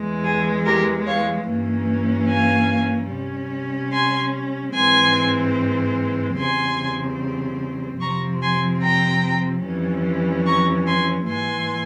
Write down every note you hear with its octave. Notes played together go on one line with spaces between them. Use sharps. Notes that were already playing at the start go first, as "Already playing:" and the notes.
Already playing: E2 E3 G#3
G#4
G4 A#4
C#5 F5
G2 E3 A#3 C#4
F5 G#5
C3 G3 C#4
G#5 C6
G#2 E3 G#3 C4 G#5 C6
E2 C#3 G3 C4 G#5 C6
F2 C3 F3 C4 A#5 C#6
G#5 C6
G5 A#5
F2 E3 G3 C#4
A#5 C#6
G#5 C6
G#2 E3 A#3 G#5 C6